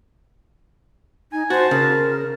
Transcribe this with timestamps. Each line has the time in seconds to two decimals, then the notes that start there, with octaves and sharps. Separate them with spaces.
1.32 D#4 G#5
1.50 F#4 C5 A5
1.71 C#3 A#4